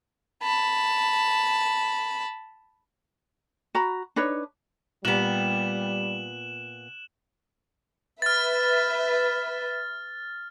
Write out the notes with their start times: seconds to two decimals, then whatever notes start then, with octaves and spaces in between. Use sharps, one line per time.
0.43 A5 B5
3.75 F#4 A#5 B5
4.16 D4 D#4 B4 C#5
5.05 A#2 G3 B3 F#6 E7 F#7
8.22 B4 E5 F6 A6